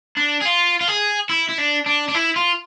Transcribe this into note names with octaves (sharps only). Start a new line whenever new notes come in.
D4
G#4
F4
F4
G#4
E4
E4
D4
D4
D4
E4
F4